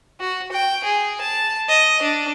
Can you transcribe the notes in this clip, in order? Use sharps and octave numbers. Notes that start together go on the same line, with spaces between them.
F#4
G5
G#4
A5
D#5
D4